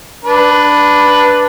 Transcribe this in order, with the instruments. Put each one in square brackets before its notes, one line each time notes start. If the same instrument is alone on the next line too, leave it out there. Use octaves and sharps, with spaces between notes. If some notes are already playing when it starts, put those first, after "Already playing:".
[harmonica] D4 B4